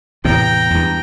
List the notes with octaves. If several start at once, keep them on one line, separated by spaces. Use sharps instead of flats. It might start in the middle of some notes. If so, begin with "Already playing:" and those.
E2 A2 C3 G5 A#5
E2 G2